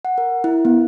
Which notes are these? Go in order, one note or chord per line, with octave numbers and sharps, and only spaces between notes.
F#5
A#4
E4
B3